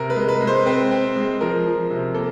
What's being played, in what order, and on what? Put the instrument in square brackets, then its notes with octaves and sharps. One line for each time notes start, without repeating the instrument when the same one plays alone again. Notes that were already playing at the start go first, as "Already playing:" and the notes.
Already playing: [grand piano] C3 A#4
B4
G#3
B4
G#3
C5
C4 B4
C4
G#3
F3 A#4
F3
C3
A#3 A4